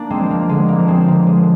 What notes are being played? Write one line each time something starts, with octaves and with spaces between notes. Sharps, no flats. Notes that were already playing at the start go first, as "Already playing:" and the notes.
Already playing: A#3 D4
G#3 C4
F3
A#3
D3 G#3
A#3
F3
G#3 C4
D3 A#3
G#3
F3